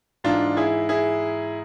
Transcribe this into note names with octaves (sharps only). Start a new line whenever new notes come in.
G#2 E3 D4 F4
E4 G#4
E4 G#4